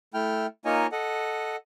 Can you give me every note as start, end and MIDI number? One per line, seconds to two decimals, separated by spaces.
0.14 0.47 57
0.14 0.47 64
0.14 0.47 79
0.14 0.47 89
0.65 0.87 58
0.65 0.87 63
0.65 0.87 65
0.65 0.87 73
0.65 0.87 75
0.65 0.87 80
0.92 1.56 69
0.92 1.56 75
0.92 1.56 78